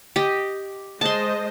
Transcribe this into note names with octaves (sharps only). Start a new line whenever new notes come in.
G4 D#5
G#3 C5 D#5 A5 C6